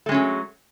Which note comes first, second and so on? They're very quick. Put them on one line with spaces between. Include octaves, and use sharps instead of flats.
A3 G#3 C#4 F#3